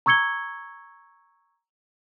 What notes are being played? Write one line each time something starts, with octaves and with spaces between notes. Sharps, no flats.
A#5 C#6 E6 G#6 C#7 G7